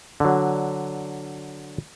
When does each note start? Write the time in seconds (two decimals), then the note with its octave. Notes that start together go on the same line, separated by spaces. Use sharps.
0.20 D3 F#3